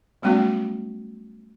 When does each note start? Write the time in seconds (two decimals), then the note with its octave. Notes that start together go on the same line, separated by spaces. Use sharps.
0.22 F#3 G3 A3 B3 C#4 F#4